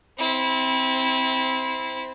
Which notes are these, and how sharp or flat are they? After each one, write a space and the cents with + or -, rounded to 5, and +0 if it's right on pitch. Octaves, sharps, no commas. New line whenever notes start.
C4 +0 E4 -20